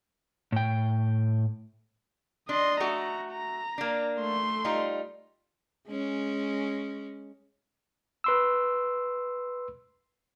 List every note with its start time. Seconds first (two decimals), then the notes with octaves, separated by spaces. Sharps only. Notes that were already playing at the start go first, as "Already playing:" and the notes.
0.52 A2 G5
2.49 D4 D#5 C6
2.80 A3 F#4 A#5
3.32 A#5
3.78 A#3 D4
4.19 A3 C6
4.65 G3 D#4 F4
5.88 G#3 C#4
8.24 B4 C6 E6